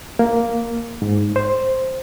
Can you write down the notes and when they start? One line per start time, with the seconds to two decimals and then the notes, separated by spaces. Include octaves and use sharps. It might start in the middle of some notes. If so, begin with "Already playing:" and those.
0.19 A#3
1.02 G#2
1.36 C5